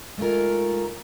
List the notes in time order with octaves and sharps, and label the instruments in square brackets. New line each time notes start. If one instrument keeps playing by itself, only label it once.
[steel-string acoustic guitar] G#3 A3 D#4 F4 A#4